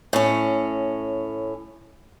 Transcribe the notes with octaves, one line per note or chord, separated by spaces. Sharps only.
A2 C#4